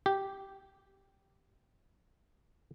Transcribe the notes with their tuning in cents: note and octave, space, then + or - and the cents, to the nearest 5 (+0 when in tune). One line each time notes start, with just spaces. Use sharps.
G4 -5